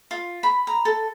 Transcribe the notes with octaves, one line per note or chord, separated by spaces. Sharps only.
F4
B5
A#5
A4